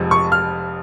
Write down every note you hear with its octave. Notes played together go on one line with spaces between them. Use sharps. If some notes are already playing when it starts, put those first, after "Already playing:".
Already playing: F1 F2 F3 G#3
C#6
F6